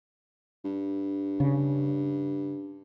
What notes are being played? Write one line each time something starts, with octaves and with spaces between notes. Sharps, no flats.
G2
C#3